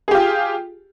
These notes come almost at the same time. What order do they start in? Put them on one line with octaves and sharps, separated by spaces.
G#4 G4 F4